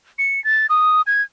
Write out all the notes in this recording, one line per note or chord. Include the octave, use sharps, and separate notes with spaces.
C#7
A6
D#6
G#6